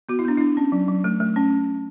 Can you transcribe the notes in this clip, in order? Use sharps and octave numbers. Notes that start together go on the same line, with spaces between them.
B3 F#4
E4
B3 D4
D4 E4
C#4
F#3
F#3
A3
A3
C#4